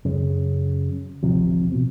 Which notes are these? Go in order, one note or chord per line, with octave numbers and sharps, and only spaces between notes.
F#2 C#3
D1 A1 C3 F3
B2